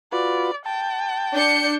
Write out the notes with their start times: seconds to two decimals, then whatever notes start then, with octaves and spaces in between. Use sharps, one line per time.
0.12 F4 F#4 B4 D5
0.66 G5 A5
1.34 D4 G6 C#7